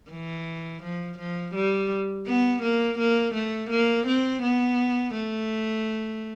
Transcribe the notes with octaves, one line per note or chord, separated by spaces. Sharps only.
E3
F3
F3
G3
B3
A#3
A#3
A3
A#3
C4
B3
A3